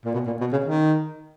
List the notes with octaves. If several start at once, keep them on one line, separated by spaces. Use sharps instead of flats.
A#2
B2
A#2
B2
C#3
D#3